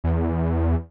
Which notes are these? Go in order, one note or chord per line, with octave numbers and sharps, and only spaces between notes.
E2